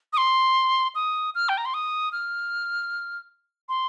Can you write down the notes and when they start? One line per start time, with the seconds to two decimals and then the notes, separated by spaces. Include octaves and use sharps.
0.13 D#6
0.17 C6
0.95 D#6
1.35 F6
1.49 G5
1.58 A#5
1.65 C6
1.74 D#6
2.12 F6
3.69 C6